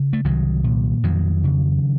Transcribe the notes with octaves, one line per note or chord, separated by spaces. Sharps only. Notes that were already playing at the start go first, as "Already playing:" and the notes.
Already playing: C#3
A3
C2 D#3 F#3
A#2
F2 D#3 F#3
C#3